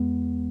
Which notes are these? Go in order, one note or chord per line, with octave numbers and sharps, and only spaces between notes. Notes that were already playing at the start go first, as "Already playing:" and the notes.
Already playing: E2 E3 G#3 B3